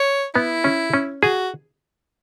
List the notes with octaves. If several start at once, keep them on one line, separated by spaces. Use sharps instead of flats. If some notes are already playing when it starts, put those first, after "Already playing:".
Already playing: C#5
B3 E4
C#4
C#4
F#4 G#4